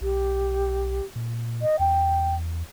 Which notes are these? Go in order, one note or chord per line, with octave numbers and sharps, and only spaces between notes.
B1 G4
A#2
D#5
E2 G5